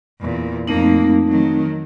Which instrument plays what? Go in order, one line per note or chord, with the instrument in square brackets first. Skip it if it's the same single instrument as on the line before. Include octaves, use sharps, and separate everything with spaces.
[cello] E2 A#2
[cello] F2 A#3 [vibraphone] A3 C4 D#4
[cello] D#3 F#3